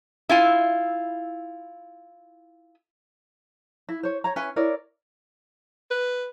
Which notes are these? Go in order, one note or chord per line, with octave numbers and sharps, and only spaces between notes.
E4 F4 G#5
E4
C5 C#5
C#5 A#5
C#4 B4 E5 G#5
E4 A#4 C#5 D5
B4